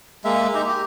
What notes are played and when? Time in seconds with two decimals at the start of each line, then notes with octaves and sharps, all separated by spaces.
0.25 G#3 A#3 E5
0.54 D#4 G4 E5 A#5
0.67 G4